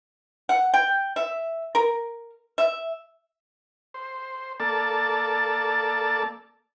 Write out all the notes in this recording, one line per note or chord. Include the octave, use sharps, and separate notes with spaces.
F#5
G5
E5
A#4
E5
C5
A#3 A4 D5 A5